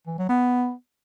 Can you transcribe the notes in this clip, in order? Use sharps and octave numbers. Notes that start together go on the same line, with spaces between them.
E3
F#3
B3